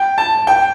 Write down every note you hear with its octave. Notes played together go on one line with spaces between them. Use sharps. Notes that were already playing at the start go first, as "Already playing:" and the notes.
Already playing: G5
A5
G5